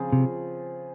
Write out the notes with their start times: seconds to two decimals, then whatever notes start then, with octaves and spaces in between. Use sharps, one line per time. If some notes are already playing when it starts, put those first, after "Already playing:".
Already playing: C#3 F3 C4 F4 G#4
0.12 C3